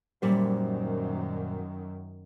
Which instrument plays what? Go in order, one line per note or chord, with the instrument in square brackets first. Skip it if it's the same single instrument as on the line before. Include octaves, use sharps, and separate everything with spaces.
[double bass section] F#2 D#3 [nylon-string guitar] A#2 G3 C5